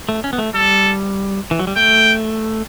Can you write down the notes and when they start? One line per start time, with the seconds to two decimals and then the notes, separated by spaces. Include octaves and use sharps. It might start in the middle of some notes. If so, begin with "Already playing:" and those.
0.09 A3
0.24 C#4
0.33 B3
0.38 A3
0.54 G3 A4
1.51 E3
1.59 F#3
1.67 G3
1.76 A3 G5